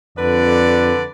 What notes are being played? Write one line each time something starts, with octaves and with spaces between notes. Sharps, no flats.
F2 D3 B4 D5